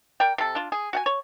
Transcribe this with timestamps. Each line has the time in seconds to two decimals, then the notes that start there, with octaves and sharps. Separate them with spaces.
0.20 A#4 D5 G5
0.38 C3 A4
0.55 D4 F4
0.72 G#4
0.93 F#4 F#5 G#5
1.06 C#5